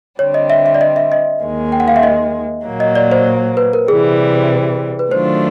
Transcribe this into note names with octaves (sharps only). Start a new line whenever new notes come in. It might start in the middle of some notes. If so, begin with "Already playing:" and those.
D3 G3 C4 C#5
D#5
E5
E5
D5
D#5
E5
D#5
D#2 D#3 G#3
G5
F#5
F5
E5
D#5
A#2 F#3 A#3
D#5
D5
C5
B4
A#4
C3 E3 G3 G#4
B4
D#3 F#3 A3 D4 F4 C5